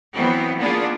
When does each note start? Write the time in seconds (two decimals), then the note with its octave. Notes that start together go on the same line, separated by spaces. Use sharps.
0.13 E3 F#3 B3 C4
0.58 A#3 B3 D4 F4 G#4